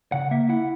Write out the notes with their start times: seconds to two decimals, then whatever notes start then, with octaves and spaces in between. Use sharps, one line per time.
0.12 C#3 F#5
0.31 A#3 E5
0.49 E4 F#5